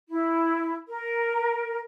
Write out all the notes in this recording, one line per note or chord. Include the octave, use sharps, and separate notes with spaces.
E4
A#4